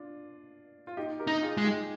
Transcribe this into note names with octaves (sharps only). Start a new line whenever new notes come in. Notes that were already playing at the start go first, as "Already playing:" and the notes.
Already playing: D4 F4
F4
D#4 G4
G4 A#4
D#4
F4 G#4
G#3 G#4
D#4 G4